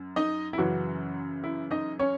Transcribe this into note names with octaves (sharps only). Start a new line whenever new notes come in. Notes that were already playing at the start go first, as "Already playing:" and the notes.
Already playing: F#2
D#4 D#5
E4
F#2 C#3 E3 F#3 F#4
E4
D#4 D#5
C#4 C#5